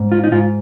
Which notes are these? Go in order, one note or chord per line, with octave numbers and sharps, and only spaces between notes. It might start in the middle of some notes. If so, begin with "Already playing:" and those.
Already playing: G#2
F4
D#4
G#2 F4